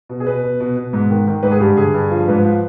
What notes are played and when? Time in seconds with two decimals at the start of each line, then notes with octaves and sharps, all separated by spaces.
0.09 B2
0.20 G#4
0.26 B2 B4
0.43 B2
0.60 B2
0.77 B2
0.93 G#2
1.10 D#3
1.28 D#3
1.43 G#2 B4
1.51 G#4
1.60 G2 G4
1.77 D3 G#4
1.94 G2
2.11 F3
2.28 G#2 B4
2.44 F3